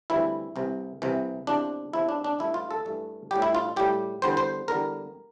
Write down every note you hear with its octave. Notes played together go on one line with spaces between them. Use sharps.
D2 C3 E3 G3 E4
C2 C3 E3
C2 C3 E3
E2 C3 F3 D4
E2 C3 F3 E4
D4
D4
G2 E3 A3 E4
F4
A4
G2 E3 A3
A2 G3 G4
E4
F4
A2 G3 G4
E2 D3 G3 C5
C5
E2 D3 G3 A#4